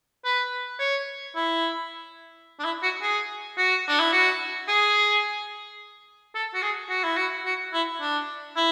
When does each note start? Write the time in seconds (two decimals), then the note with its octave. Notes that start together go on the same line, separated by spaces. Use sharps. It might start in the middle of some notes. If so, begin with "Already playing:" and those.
0.25 B4
0.79 C#5
1.35 E4
2.59 D4
2.65 E4
2.83 F#4
3.02 G#4
3.57 F#4
3.88 D4
4.00 E4
4.13 F#4
4.68 G#4
6.35 A4
6.54 F#4
6.62 G#4
6.90 F#4
7.03 E4
7.17 F#4
7.45 F#4
7.73 E4
8.01 D4
8.56 E4